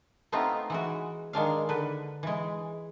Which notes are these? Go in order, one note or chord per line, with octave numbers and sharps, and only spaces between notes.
A3 B3 C4 D#4 F4
E3 G#3 F#4
D#3 G#3 D4 F5
D3 B4
E3 G#3